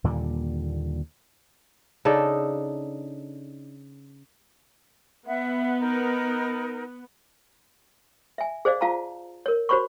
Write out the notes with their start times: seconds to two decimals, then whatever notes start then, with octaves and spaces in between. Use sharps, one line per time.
0.04 D#2 A#2 D3 G3
2.05 C#3 D4 D#4 A4
5.27 B3 E5 F#5
5.80 D#4 A#4
8.38 E5 G#5
8.65 G#4 C5 D5 D#5 F5
8.81 F4 F5 A5 A#5
9.46 A#4 C#5
9.69 F#4 C5 C#5 B5 C#6